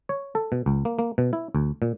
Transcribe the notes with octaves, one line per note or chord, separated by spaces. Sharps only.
C#5
A4
B2
C#2
A#3
A#3
B2
E4
D2
A#2